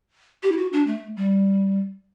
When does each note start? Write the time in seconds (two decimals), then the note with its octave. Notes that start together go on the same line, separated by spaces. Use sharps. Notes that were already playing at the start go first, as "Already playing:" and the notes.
0.43 G4
0.52 E4
0.57 F#4
0.73 D4
0.87 A3
1.17 G3